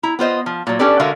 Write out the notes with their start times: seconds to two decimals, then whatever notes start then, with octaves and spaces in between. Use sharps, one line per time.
0.03 E4 A#5
0.19 B3 F4 C5 D#5
0.46 F3
0.67 A#2 F#3
0.79 C#4 D4 G4 A4 B4 D5
1.00 D3 G#3 F#4 A#4 E5 F5